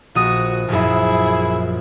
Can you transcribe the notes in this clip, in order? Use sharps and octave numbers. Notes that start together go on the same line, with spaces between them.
A#1 F#4 D#6
A#1 F#2 E4 G#4